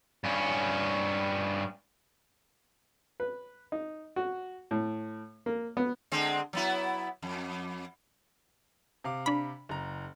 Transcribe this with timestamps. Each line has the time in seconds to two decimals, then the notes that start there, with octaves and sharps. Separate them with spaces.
0.24 G2 C#4
3.20 B4
3.72 D#4
4.16 F#4
4.71 A2
5.46 A#3
5.77 B3
6.12 D3 G#3 C4
6.53 F#3 B3 E4
7.22 F2
9.04 C3 F5 D6
9.26 D4 B5
9.69 F#1 A#5